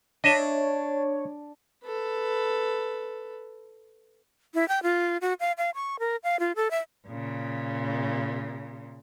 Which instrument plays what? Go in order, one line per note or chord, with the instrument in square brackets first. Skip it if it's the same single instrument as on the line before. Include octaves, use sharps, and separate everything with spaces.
[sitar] D4 [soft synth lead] C#5 [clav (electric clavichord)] D#5 E5
[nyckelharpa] A4 B4
[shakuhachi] E4
G5
F4
F#4
F5
F5
C#6
A#4
F5
F4
A4
E5
[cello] A#2 C#3